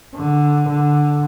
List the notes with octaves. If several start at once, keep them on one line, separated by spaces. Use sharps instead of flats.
D3
D3